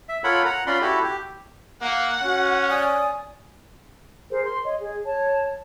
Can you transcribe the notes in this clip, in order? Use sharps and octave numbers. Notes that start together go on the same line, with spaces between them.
E5
F4 A4 A#4 C#5 F#5 B5
F#5 A#5
C#4 F4 D5 B5 C6
E4 F#4 G4 A4
G4
A#3 F#5
C#4 F#4
D5 G#5 D#6
G#4 A#4 C5
C6
C#5 D#5
G#4
C#5 A5